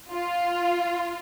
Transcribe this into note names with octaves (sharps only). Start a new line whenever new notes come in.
F4